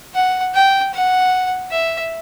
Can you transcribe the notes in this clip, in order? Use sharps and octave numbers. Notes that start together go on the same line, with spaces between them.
F#5
G5
F#5
E5